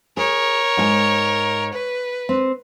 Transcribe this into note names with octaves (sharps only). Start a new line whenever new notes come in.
G#4 A#4 C#5
G#2 A4 G#5
B4
C4